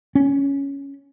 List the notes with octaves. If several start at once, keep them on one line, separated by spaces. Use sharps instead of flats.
C#4